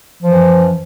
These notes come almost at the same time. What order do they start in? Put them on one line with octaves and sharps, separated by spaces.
F3 E3 F#2